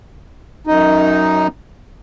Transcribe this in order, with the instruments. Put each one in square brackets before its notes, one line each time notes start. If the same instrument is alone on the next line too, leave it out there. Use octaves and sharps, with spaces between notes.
[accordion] F#2 D#4